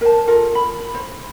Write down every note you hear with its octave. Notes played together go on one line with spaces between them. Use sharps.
A#4 C5 A5
F4 A4 A#4
B5
C5